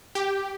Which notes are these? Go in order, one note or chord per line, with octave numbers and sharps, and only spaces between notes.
G4